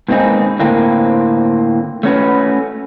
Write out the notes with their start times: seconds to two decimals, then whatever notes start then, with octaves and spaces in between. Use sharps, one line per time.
0.08 G#2 B2 A#3 C4 D#4 G#4
0.59 A2 D3 A#3 C4
2.03 A3 C#4 F#4 B4